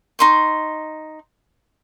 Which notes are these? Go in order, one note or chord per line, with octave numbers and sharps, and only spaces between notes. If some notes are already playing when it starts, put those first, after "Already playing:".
D#4 C6 C#6